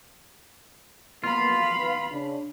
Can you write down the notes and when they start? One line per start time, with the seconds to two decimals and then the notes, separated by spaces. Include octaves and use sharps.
1.24 A#3 B3 F4 F5 B5
1.78 D#3 B3 B4
2.11 C#3 D4